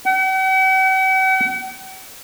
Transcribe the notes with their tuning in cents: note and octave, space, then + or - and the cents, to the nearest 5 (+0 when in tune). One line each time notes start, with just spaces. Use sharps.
F#5 +45